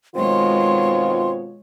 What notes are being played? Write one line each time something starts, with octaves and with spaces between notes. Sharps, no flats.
B2 D#3 G#3 C4 F4 C#5 C6